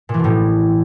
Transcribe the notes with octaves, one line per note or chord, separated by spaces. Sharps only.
A#2
E3
B2
A2